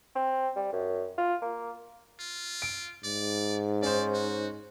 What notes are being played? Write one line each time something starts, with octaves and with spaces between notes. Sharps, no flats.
C4
G3
F#2
F4
A#3
F4
D7
G#2 D5
C#4 D#4 C5 D5
F#4